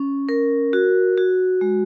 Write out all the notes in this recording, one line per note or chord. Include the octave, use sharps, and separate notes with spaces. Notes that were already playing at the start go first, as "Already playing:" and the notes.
Already playing: C#4
A#4
F#4
F#4
G#3